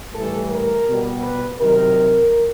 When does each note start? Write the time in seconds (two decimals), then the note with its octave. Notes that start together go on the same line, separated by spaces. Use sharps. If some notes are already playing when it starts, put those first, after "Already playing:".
0.15 A2 E3 G3 A4
0.51 A#4
0.87 B2 G3
1.23 B4
1.59 C3 D#3 F#3 A#4